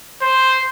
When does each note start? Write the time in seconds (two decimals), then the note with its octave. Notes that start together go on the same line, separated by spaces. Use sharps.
0.22 C5